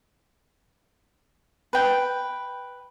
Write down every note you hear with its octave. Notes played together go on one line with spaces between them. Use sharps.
B4 G5